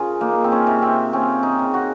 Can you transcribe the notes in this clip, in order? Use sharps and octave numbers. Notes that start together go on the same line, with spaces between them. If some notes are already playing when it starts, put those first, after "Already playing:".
Already playing: C#3 F4 G#4 A#4
A#3 D#4
C4
C#4
C3
C4
C4 C#4
D#4
C#3
F#4